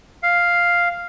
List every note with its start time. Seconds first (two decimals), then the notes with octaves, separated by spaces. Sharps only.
0.23 F5